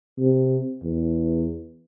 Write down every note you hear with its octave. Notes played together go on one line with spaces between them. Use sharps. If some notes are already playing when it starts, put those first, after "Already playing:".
C3
E2